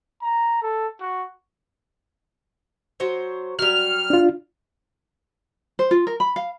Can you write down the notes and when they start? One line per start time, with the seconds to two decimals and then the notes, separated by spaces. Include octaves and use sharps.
0.22 A#5
0.62 A4
1.01 F#4
3.00 F#3 C5 C#5
3.59 F#3 G3 F6
4.10 D4 F4
5.79 C5
5.91 F4
6.07 A#4
6.20 B5
6.36 F5